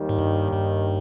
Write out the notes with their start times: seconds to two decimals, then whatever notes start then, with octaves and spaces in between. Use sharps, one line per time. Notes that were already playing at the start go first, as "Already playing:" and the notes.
Already playing: D#2 D#3 G3
0.09 G#2
0.18 G2
0.53 G2